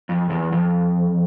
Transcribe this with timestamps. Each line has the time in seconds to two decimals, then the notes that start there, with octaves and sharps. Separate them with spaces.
0.09 F2
0.30 E2
0.52 F2